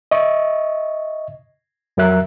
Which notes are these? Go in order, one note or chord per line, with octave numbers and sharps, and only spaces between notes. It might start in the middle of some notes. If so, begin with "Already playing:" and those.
D#5 E5 C#6
F2 F#3 A#4 E5 F#6